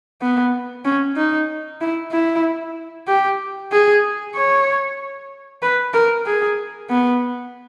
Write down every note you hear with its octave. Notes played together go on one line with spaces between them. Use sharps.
B3
C#4
D#4
E4
E4
G4
G#4
C#5
B4
A#4
G#4
B3